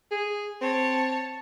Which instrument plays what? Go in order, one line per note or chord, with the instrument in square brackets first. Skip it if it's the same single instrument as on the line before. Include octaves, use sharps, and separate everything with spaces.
[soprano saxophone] G#4
[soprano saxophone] C4 [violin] C#5 A5